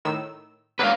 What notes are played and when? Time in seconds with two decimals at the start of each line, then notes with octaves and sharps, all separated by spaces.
0.05 A2 D#3 E6
0.79 F#3 A#3 D4 B4 F5